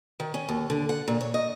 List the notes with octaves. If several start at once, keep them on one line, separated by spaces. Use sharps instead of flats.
D#3
C#4
D#2
D3
F#5
A#2
C#5
D#5